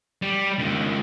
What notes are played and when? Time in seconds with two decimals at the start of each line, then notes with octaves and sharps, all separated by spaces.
0.22 G3
0.59 C#2 D#3